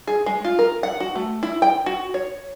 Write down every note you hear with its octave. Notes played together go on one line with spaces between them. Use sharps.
G#4
G#3
F4
A#4
F#5
F#4
A3
E4
G5
F#4
C#5